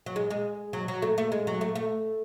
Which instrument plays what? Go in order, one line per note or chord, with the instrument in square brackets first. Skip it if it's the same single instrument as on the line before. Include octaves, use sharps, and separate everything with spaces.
[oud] F#3
G#3
G#3
F#3
F#3
A3
A3
G#3
F#3
A3
A3